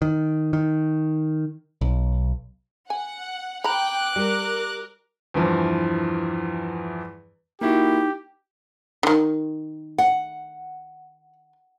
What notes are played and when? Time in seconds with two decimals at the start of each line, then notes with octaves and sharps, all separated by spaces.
0.02 D#3
0.53 D#3
1.81 B1
2.90 F#5 G#5
3.64 G5 A#5 B5 D6 F#6
4.16 G3 A#4
5.34 E2 G2 E3 F3
7.61 A#3 D#4 E4 F#4 G4
9.03 D3 D#3
9.98 F#5